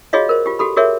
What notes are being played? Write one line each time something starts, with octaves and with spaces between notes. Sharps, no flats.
F4 F#4 G#4 C#5 D#5 F5
A#4 C5
F4 G4
F#4 G4 A4 B5
F#4 G#4 A#4 C#5 E5